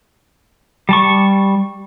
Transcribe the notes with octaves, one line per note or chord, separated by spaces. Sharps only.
G3 A5 C#6